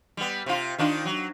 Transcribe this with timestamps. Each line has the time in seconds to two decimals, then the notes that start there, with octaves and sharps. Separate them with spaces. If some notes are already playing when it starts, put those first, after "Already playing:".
0.17 G3 B3
0.46 C3 F4
0.78 D#3 D4 F4
1.05 F#3